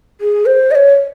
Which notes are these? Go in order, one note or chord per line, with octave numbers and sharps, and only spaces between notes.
G#4
C5
D#5
C#5